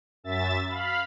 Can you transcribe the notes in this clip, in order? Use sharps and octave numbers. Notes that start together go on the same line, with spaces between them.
F#2 E5 A6
F5 B5